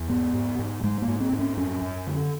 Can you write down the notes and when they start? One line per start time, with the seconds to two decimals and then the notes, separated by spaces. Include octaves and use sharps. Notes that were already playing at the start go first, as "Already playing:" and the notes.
Already playing: E2
0.09 G#2 B3
0.34 G#2
0.59 G#2
0.83 G#2 G#3
1.02 A#3
1.08 G#2
1.20 C4
1.33 G#2
1.39 C#4
1.57 F#2 C#4
1.82 F#2
2.07 D3